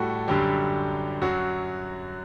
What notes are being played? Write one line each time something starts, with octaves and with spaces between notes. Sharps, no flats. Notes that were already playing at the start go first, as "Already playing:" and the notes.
Already playing: A2 G3 A3 F#4 A4
F#2 D3 F#3 G3 G4
F#2 F#3 F#4